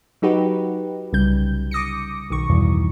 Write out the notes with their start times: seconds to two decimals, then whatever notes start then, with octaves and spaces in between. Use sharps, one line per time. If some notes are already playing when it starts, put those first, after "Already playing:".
0.22 F#3 D#4 F#4 G4 B4
1.13 C2 C#3 G3 G6
1.71 D6 D#6 A#6 C#7
2.30 B1 D#3 C#6
2.49 E2 G2 B2 D#3 E3